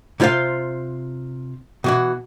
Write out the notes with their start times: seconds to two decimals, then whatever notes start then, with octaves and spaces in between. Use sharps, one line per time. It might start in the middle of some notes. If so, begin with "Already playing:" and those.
0.20 C3 E4 F4 C5 F5
1.84 B2 E3 F#4